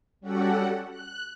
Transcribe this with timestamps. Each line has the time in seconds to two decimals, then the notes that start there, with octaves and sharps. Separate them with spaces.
0.21 G3 C#4 F#4 G4 A4 F#5
0.90 F#6